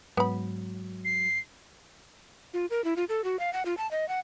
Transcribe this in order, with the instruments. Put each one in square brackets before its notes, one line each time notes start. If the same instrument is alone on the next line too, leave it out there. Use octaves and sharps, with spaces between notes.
[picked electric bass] G#2 [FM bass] F#3 [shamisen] B3 B5
[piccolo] C7
[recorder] F4
A#4
E4
F4
A4
F#4
F5
F#5
F4
A5
D#5
F#5